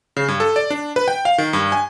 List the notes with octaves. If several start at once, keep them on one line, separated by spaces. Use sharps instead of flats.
C#3
G2
A4
D5
D4
B4
G5
F5
D#3
G2
G#5